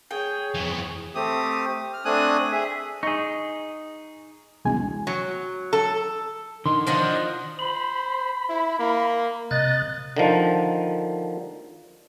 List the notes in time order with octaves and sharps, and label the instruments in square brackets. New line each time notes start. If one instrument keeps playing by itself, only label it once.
[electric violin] G#4 C#5 [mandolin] G5
[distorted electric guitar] F2 E3
[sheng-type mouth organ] A3 C4 G4 D#6
F6
A3 C4 D4 G#5 D#6 F#6
G#4 E5
[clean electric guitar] D#4 G#4 [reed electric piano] C#6
[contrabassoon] E1 [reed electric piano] C2 G#3 G#5
[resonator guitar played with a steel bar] F#3
A4
[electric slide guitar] D3 [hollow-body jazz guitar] D#3 [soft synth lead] C6
[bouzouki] F3 D#5 F#5 [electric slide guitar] D4 D#4
[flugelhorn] C5 [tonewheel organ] B5
[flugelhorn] E4
A#3
[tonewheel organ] C3 F#6 A6 [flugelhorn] D#5
[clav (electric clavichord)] D3 D#3 F3